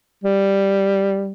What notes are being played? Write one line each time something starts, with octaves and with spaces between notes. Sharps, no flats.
G3